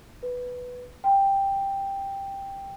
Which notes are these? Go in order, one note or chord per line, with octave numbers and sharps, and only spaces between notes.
B4
G5